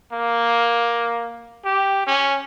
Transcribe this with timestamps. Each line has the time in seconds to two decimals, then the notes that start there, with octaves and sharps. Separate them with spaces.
0.13 A#3
1.65 G4
2.07 C#4